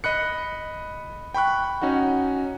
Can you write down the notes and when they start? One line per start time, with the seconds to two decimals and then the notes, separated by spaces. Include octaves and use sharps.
0.04 D#5 B5 F#6 C#7
1.34 G5 B5 C#6 F#6
1.82 C#4 D#4 F#4 F#5